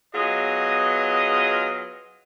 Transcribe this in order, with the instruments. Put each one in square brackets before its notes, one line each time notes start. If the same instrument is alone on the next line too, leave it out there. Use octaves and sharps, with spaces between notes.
[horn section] F#3 B3 F4 G#4 D#5